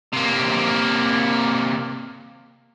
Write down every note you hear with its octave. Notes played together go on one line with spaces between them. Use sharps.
C3 A#3